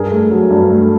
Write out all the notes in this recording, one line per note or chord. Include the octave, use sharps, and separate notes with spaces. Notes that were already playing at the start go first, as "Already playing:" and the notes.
Already playing: G2 G#4 A#4
A3
F#3
G2
A3